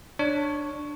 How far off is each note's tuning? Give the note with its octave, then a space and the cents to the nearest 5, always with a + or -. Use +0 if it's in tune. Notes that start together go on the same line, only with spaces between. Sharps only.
D4 +10 C#5 +0